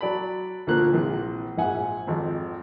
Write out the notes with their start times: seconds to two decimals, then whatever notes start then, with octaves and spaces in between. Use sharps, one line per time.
0.01 F#3 D5 A5 B5
0.67 D2 A#2 F3 A#3 F#6
0.92 A#1 C3 E3
1.57 A#1 G#2 E5 F#5 G#5
2.07 G#1 F2